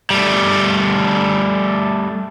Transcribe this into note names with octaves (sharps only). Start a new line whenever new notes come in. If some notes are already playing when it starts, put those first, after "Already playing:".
G3 A3